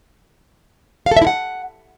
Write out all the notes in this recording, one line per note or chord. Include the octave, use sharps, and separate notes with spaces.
F5
A4
E5
E4
F#5